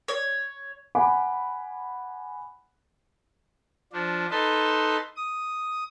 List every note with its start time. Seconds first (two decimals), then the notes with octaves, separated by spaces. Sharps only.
0.08 C#5
0.95 F#5 G#5 B5 D6
3.93 F3 D4
4.31 D#4 A4 B4 A5 C6
5.16 D#6